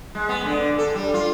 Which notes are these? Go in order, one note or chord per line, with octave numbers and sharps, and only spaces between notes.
G#3
B3
D3
A4
G3
F4